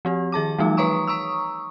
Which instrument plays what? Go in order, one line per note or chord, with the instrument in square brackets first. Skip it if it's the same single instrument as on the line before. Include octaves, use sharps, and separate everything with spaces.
[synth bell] F3 C4 G4
D#3 G#4 A5 D6
E3 F3 G3 A3 D#4
B4 C#5 A#5 C#6 D#6
A#5 C#6 D#6 E6